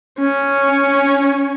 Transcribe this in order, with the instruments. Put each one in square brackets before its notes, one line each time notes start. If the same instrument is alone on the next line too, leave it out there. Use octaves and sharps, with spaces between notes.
[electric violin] C#4